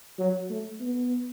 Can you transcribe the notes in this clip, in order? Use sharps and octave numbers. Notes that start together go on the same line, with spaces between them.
F#3
A3
B3